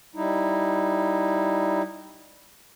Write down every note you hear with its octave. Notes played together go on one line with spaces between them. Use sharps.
G3 D#4 E4